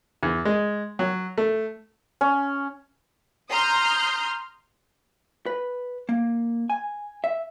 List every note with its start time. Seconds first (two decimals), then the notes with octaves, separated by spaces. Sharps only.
0.23 E2
0.45 G#3
0.99 F#3
1.38 A3
2.21 C#4
3.50 A#5 C6 D#6 F6 G6 C7
5.46 B4
6.09 A#3
6.70 G#5
7.24 E5